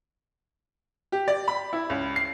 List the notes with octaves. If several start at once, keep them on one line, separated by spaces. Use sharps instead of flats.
G4
D5
B5
E4
C#2
C7